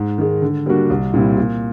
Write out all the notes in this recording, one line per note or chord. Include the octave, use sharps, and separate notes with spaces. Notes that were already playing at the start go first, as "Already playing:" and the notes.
Already playing: G#2
D#3 G#3
D3
G3 A#3 D4 F#4
C2
A#2 G3 C4 E4
A#2